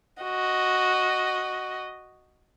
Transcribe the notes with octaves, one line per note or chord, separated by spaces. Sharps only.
F#4 D#5